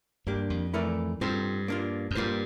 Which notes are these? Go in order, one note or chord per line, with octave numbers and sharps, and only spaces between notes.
G2 A#3 D4 G4
F2
E3 A3 E4 A#4 D5
G2 G3 C4 F4 A4 C5
A#3 D4 F4
F2
G2 G3 A#3 F4 C5